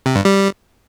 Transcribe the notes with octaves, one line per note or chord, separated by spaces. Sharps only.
C3
G2
G3